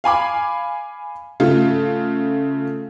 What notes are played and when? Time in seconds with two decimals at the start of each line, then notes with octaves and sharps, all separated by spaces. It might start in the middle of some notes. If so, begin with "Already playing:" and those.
0.04 F5 G#5 B5 D6
1.40 C#3 A3 F4